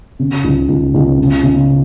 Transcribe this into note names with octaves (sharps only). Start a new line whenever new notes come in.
C#3
C#2
C#2
C#2
C#3
C#3